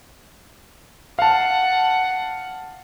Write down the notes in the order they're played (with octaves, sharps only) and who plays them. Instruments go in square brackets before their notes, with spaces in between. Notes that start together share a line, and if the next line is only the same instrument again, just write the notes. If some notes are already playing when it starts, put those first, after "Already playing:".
[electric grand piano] F5 A5 [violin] F#5